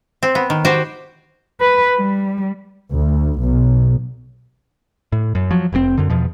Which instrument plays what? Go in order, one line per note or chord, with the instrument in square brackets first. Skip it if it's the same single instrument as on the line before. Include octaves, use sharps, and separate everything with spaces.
[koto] C4
B3
D#3
F#4 G4 C5 G5
[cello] B4
G3
[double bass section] D2
B1
[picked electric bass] A2
F#2
F3 F#3
F1 A2 C4
F#2 D3
E2 B2 F3